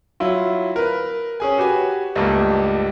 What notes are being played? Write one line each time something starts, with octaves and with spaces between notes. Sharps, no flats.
F#3 E4 F4
A#4 B4
C#4 G#4 G#5
F#4 G4 B4 G#5
C#2 G2 G3 A3 A#3